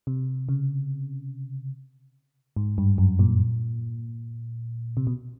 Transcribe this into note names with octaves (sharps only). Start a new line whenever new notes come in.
C3
C#3
G#2
G2
F#2
A#2
C3
B2